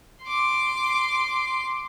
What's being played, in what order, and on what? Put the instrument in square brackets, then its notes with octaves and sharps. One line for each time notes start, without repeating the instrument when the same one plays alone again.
[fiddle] C6 D6